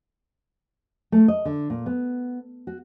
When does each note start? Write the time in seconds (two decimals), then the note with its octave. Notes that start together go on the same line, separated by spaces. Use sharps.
1.12 A3
1.28 D#5
1.45 D3
1.70 A#2
1.86 B3
2.67 F#4